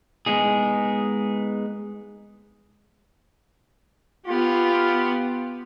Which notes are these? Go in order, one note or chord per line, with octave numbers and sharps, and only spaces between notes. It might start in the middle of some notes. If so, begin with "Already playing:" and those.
G#3 B3 D#4 G#4
B3 F4 G4